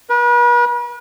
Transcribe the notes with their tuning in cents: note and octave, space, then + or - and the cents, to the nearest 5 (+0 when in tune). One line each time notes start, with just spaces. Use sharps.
B4 -40